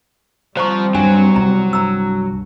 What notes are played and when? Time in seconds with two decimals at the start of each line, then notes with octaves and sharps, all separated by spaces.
0.57 F3 G3 C4 C5 A#5 C#6
0.95 G2 F#3 G#5
1.36 C2 A#5
1.73 G2 A#5 E6